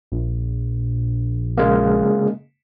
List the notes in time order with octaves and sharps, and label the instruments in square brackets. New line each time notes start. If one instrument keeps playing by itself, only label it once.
[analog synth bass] A#1
[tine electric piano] C#3 G#3 A#3